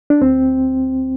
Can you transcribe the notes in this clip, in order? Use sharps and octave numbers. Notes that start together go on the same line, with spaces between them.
D4
D2 C4